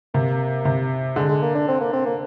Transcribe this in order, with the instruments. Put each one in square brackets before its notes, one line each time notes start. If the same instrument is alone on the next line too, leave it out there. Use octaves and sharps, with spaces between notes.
[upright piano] C3 [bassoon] A#3
[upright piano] C3
[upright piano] D3 [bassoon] G#3
[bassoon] G#3
A#3
D4
C4
A#3
C4
A#3